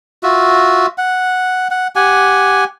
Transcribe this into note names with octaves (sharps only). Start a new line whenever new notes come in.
F4 F#4 E5
F#5
F#5
G4 F#5 G#5